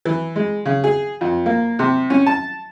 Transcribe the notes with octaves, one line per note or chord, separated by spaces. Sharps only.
E3
G#3
C#3
G#4
F2
A#3
C3
C#4
A5